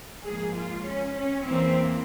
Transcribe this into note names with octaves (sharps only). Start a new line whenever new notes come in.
G#2 F3 A#3 G#4
F4
C#4
C#4
E2 E3 A#3 C4